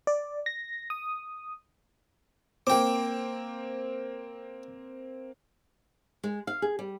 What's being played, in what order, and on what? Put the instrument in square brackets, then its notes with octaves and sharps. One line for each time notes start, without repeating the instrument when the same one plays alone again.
[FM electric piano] D5
A#6
D#6
[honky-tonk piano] A#3 C4 [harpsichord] G5 D6
[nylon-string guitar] G#3
F5
G#4
G3